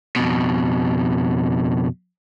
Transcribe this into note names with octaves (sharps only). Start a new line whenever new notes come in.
F2 B2